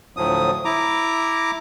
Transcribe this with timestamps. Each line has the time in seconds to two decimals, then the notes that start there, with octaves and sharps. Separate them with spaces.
0.17 D2 A2 F3 F#3 D#6
0.65 E4 A#5 D6